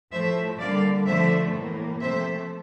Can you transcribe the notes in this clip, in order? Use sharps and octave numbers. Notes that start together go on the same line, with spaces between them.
A2 F3 A3 C5 E5
D3 G3 A#3 D5 F5
D3 F3 A3 C5 E5
A2 E3 A#3
C3 F3 A3 C5 E5